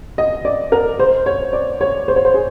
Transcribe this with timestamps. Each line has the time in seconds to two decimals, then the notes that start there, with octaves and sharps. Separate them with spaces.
0.18 D#5
0.45 D5
0.72 A#4
0.99 C5
1.26 C#5
1.53 D5
1.81 C#5
2.08 C5
2.16 C#5
2.25 C5
2.34 G#4